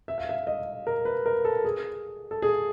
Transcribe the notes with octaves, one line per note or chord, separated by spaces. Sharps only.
E5
F5
E5
D#5
A#4
B4
A#4
A4
G#4
A4
G#4